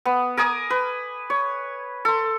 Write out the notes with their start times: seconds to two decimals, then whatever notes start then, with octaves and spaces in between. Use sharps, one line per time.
0.05 B3
0.37 A#4 G#5 D6 D#6
0.70 B4
1.30 C#5
2.05 A4 C6